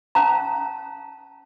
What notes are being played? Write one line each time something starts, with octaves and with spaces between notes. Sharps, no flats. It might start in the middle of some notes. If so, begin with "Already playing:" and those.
C#4 F5 A5 A#5